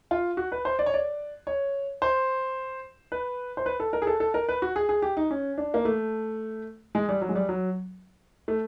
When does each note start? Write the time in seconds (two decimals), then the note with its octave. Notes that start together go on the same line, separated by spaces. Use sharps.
0.11 F4
0.37 F#4
0.52 B4
0.65 C5
0.79 D5
0.86 C#5
0.94 D5
1.47 C#5
2.02 C5
3.12 B4
3.57 C5
3.66 B4
3.80 A4
3.93 A#4
4.02 G#4
4.07 A4
4.20 A4
4.34 A#4
4.49 B4
4.62 F#4
4.76 G#4
4.89 G#4
5.02 G4
5.17 D#4
5.31 C#4
5.58 D4
5.74 A#3
5.85 A3
6.95 G#3
7.09 G3
7.22 F#3
7.29 G#3
7.35 G3
7.49 F#3
8.48 A3